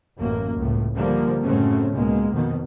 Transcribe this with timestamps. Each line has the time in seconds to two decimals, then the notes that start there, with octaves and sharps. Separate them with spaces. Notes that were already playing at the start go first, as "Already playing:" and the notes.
0.19 A1 F#2 A#3
0.56 C#2 A2
0.95 D3 F3 G3 A#3
1.43 F#2 A2 C#3 A3 C4 C#4
1.91 C#2 B2 G#3 A#3
2.31 F2 B2 D#3